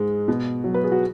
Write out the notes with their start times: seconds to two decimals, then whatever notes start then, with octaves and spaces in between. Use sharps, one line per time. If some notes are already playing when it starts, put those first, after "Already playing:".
Already playing: G#2 G#3
0.28 B2
0.64 F#3
0.74 B4
0.84 G#4
0.92 F#4